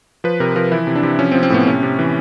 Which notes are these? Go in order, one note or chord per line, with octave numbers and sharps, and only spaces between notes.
F3 B4
C3 A#4
F3 A#4
E3 E4
C3
D4
C3
F3 C#4
C4
F3
C4
A2 B3
C3 C#4
C3
E3